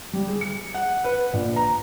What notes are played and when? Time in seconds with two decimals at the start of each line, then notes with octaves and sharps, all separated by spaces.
0.13 G3
0.28 G#4
0.41 C#7
0.74 F#5
1.04 B4
1.33 A#1
1.56 A#5